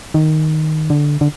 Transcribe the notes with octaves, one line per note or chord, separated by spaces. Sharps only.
D#3
D3
D3